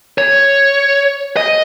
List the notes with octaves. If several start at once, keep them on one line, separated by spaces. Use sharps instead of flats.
C#5
D#5